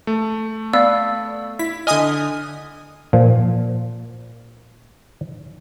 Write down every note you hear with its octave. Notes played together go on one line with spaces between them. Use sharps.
A3
B3 D5 F5 E6
E4 B6
D3 D#5 G#5 D#6 F6
A#2 F3